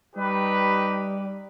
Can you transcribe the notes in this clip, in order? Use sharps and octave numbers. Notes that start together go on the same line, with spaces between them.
G3 D#4 G4 B4